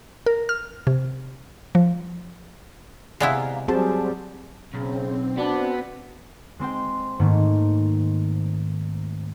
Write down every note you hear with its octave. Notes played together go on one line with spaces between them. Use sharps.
A#4
F6
C3
F3
C3 G#3 B3 E4 D5 F5 A#5
F#3 G3 C4 F#4 G#4 C5 A5
B1 C#3 C4
B3 D4 F#4
G#3 C4 C5 G5
G#2 D#3 A3 A#3